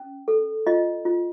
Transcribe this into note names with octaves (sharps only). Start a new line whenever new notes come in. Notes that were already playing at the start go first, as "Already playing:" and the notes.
Already playing: C#4
A4
F4 D#5
F4